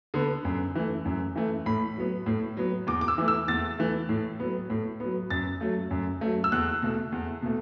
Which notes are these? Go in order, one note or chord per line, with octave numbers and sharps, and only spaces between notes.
D3 B3
F#2
E3 A3
F#2
E3 A3
A2 B5
F#3 B3
A2
F#3 B3
E2 D6
D6
E6
E3 A3
E6
E2 A6
E3 A3
A2
F#3 B3
A2
F#3 B3
F#2 A6
F#3 A3
F#2
F#3 A3
E6
E2 F#6
B2 A3
E2
B2 A3